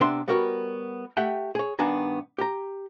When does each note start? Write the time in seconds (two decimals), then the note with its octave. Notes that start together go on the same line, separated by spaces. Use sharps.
0.01 C3 B3 D4 E5 C6
0.28 G3 B3 F#4 A#4 C#5
1.17 A3 G4 E5 F#5 G5
1.55 G#4 C#5
1.79 G2 D#3 B3 D4 G#5 A#5
2.38 G4 A#5